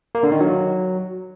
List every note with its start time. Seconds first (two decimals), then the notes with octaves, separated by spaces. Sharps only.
0.15 A#3
0.23 D3
0.32 D#3
0.40 F#3